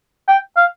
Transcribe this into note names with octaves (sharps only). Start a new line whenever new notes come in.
G5
F5